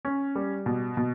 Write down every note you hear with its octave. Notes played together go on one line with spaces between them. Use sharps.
C#4
G3
B2
B2